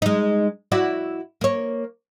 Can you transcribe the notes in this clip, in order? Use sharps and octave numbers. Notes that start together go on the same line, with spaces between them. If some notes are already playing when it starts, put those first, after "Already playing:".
G#3 D#4
E4 F#4 D5
A#3 C#5